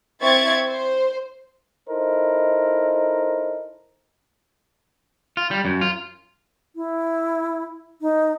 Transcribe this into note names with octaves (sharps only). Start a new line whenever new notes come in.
C4 E4 E5 C#6 G#6 A6
C5
D#4 E4 A4 A#4 C5 D#5
F4
G3
F#2
F4
E4
D#4